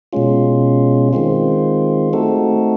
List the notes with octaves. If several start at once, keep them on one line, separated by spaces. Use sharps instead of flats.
B2 G#3 C#4 F4
D#3 G#3 C4 F4
A3 C4 D#4 F#4 A4